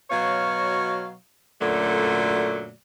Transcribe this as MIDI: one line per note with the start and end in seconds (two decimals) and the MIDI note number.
0.10 1.15 47
0.10 1.15 54
0.10 1.15 73
0.10 1.15 77
1.60 2.72 42
1.60 2.72 46
1.60 2.72 50
1.60 2.72 54
1.60 2.72 57
1.60 2.72 74